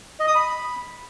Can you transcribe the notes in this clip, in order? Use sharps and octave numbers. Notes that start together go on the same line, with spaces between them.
D#5
D#6
B5